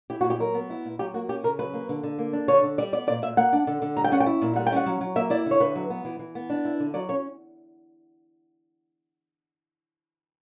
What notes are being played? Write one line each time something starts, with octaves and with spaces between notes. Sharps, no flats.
E4 G4
F#4
A#2
G4
F#3 A#4
B3
E4
A#2
F#3 G4
A#3 F#4
C#4 G4
C#3 A#4
F#3 B4
A#3
D3
D3
A#3
D4
D3 C#5
D3
G3 D5
B3 D5
A#2 D5
A#2 E5
A#3 F#5
D4
D3
D3
G3 A#5
G5
C#4 F#5
G5
E4
A#2
G3 F#5
G5
C#4 F#5
F#3
F#3
A#3 E5
E4 D5
D3
C#5
D3 B4
F#3
B3
E3
E3
B3
D4
E4
D3
F#3 D5
C#4 C#5